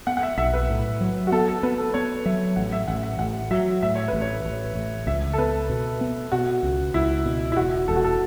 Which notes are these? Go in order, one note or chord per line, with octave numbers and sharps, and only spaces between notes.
B3 F#5
F#5
E5
B1 E5
B4
A2
F#3
F#4
B3 A4
A4
B3 B4
A4
B3 C#5
F#3 E5
A1 F#5
E5
A1 F#5
E5
A1 F#5
F#3 E5
A2 E5
C#5
B4
A1
C#5
A1
A1
C#2 E5
A4
B3 B4
B2
B3
B2 F#4
C#2
C#2 E4
B2
E4
E1 F#4
E1 A4
F#4
A4